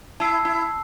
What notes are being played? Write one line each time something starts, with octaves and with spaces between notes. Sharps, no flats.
E4 A5 E6 C7
E4